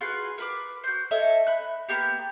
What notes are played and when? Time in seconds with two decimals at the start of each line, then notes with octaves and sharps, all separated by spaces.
0.01 F4 F#4 G#4 B4
0.38 A#4 B4 D6
0.84 F#4 C5
1.11 A4 C#5 D#5 E5
1.47 B5 F#6
1.89 A#3 B3 G4